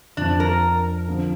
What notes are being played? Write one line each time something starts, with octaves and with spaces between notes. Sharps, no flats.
F2 F3 C4 D4
A#4
D3 F3 C4